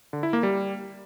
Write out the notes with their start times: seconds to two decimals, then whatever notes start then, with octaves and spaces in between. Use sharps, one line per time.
0.13 D3
0.23 E4
0.33 A#3
0.43 G3